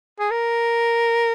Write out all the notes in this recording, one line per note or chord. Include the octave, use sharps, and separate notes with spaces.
G#4
A#4